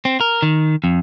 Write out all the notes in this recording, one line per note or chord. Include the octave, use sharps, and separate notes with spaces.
C4
A#4
D#3
F2